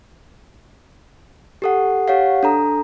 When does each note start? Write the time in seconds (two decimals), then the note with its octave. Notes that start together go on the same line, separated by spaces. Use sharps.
1.62 G4 A4 F#5
2.08 G4 C#5 F5 F#5
2.43 D4 A4 A#5